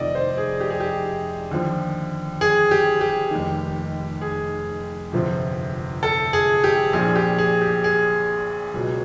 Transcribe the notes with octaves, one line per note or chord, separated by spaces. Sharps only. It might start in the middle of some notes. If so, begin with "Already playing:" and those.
Already playing: F1 F2 C3 D#3 D5 D#5
C5
G#4
G4
G#4
G4
D#2 D3 F3
G#4
G4
G4
F1 D#2 D#3
G#4
G1 F2 C3 F3
A4
G#4
G4
A#1 A#2 F3 G#4
G4
G#4
G4
G#4
C#2 B2 F#3